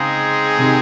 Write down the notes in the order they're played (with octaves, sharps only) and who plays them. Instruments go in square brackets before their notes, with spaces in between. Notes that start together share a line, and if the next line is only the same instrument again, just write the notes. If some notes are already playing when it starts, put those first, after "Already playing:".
Already playing: [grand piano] C#3 [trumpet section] G#3 C4 D#4 G#4
[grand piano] C3 D#3